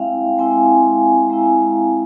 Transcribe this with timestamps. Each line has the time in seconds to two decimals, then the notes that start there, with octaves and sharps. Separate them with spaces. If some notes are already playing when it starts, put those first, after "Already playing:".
Already playing: G#3 C4 E4 E5 F5 G5
0.38 G#3 C4 E4 G#5
1.30 G#3 C4 E4 A#5